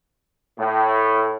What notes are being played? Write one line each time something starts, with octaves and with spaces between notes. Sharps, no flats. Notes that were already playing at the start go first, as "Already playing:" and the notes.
A2